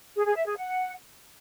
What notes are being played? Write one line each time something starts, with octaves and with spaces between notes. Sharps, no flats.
G#4
G#4
E5
G#4
F#5